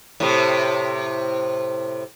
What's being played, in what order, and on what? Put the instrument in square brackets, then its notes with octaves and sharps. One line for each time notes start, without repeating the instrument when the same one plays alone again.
[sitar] A2 C3